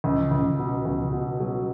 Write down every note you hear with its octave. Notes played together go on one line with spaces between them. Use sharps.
C#2
C#2
B2
C#2
B2
F#3